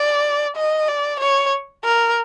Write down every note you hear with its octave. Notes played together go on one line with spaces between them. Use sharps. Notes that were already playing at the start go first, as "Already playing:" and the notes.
Already playing: D5
D#5
D5
C#5
A#4